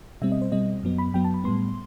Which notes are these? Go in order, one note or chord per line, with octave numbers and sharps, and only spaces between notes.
B2 G3 C4 E5
D#5
C5
B2 G3 C4 D#5
F#2 F#3 B3
B5
F#2 F#3 B3 G5
A5
B5
A2 G3 B3 C6